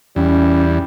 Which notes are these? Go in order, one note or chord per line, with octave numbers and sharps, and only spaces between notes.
E2 G3 C#4